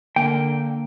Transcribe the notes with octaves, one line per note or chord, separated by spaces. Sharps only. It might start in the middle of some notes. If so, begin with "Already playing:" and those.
D3 A#3 G5